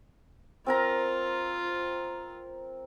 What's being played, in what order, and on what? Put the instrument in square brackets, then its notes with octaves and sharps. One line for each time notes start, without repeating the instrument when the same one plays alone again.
[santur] C4 A#4 A#5 [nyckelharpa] F4